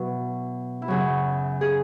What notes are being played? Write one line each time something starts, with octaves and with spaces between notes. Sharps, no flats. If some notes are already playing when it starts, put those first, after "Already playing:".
Already playing: B2 F#3 E4 F#4
E4
F#2 C#3 F#3 F#4
G#4